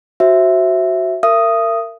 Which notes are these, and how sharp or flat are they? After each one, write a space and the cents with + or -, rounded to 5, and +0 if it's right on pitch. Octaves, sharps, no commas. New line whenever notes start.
F#4 +0 C5 +20 E5 +0
A#4 -25 E5 +40 D#6 +0